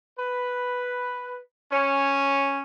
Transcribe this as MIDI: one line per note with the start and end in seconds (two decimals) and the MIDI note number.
0.18 1.39 71
1.72 2.62 61